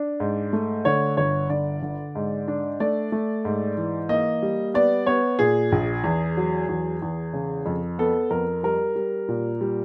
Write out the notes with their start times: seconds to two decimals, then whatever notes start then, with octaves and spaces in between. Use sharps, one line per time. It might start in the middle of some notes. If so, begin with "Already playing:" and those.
Already playing: D4
0.20 G#2
0.53 A3
0.85 D3 C#5
1.17 G1 C#5
1.50 D3 D5
1.82 D3
2.15 G#2
2.48 D4
2.80 A3 D5
3.12 A3
3.45 G#2
3.77 E3
4.09 A#3 D#5
4.42 G3
4.74 B3 D5
5.06 B3 C#5
5.39 A#2 G#4
5.72 A#1
6.04 E2
6.37 F#3
6.69 E2
7.02 E2
7.34 C#3
7.66 F2
7.99 B3 A4
8.31 F2 A#4
8.63 G3 A#4
8.96 G3
9.29 A#2
9.61 G3